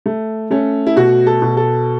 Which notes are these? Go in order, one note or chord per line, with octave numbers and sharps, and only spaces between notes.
A3
A3 C#4
E4
B2 F#4
A4
B2
A4